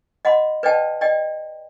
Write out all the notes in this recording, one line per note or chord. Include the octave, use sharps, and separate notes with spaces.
D#5 F#5 B5 C6
B4 D5 D#5 F#5 G5 A5
D5 D#5 G5